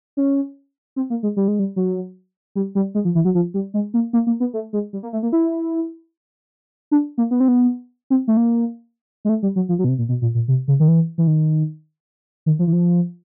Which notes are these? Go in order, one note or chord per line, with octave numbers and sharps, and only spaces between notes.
C#4
C4
A#3
G#3
G3
G#3
G3
F#3
G3
G3
G#3
F3
E3
F#3
F3
G3
G#3
A#3
A#3
A#3
B3
A3
G#3
G3
A#3
A3
A#3
E4
D4
A#3
B3
C4
B3
C4
A3
A#3
G#3
A3
G3
F#3
F3
F#3
B2
C3
A#2
B2
A#2
A#2
C3
C#3
D#3
E3
E3
D#3
D#3
F3
E3
F3